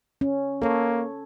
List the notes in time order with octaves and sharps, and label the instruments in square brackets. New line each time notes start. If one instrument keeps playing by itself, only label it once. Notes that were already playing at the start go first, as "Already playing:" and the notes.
[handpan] C#4
[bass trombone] A#3 [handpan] A4 C#5